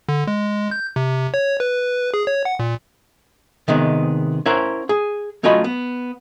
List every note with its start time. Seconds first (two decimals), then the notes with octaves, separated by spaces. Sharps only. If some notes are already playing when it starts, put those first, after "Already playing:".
0.09 D3
0.27 G#3
0.71 G6
0.96 C3
1.34 C#5
1.60 B4
2.14 G#4
2.27 C#5
2.45 F#5
2.59 A#2
3.68 C3 D#3 G#3 B3
4.46 C#4 E4 A#4 C5 C#5 F#5
4.89 G#4
5.43 F#3 A3 C#4 F4 D#5 B5
5.64 B3